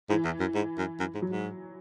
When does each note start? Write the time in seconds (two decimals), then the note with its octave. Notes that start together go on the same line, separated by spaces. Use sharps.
0.09 G#2 E3
0.25 E2
0.40 F#2
0.54 G#2
0.78 F#2
1.00 F#2
1.14 G#2
1.22 F#3
1.30 G#2